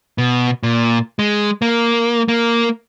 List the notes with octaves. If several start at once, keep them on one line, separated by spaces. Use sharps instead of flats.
B2
A#2
G#3
A#3
A#3